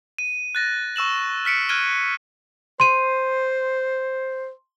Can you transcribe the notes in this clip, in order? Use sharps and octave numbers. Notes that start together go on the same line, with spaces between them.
D#7
F#6 A6 A#6
C#6 E6 E7 F#7
F6 B6 C#7 D7
F6 F#6 G#6 D7 D#7 G7
C5 C6 D#7